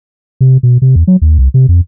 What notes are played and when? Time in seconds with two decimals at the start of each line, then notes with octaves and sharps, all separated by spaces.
0.41 C3
0.63 B2
0.82 C3
0.95 E2
1.07 F#3
1.22 D#2
1.39 C2
1.54 C3
1.69 F2